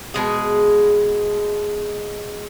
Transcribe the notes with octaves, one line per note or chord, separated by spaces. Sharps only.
B2 G#3 G#4